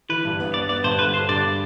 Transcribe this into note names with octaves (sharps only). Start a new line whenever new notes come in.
E3 B4
G2
B3
B3 D5
B3 D5
G2 C5
D3 B4
D3 C5
G2 D5